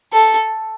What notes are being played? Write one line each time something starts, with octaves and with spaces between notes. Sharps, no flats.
A4